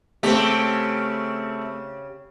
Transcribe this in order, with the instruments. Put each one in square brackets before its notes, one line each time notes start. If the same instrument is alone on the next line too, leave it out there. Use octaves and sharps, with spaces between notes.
[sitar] C#3 G4 [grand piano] A3 C4